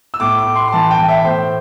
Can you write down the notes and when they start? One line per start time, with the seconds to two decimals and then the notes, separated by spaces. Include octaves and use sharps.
0.14 E6
0.20 A2 D6
0.39 D6
0.47 A2
0.56 C6
0.68 C6
0.72 E3 A5
0.91 G5
0.99 E3
1.08 E5
1.25 A2 C5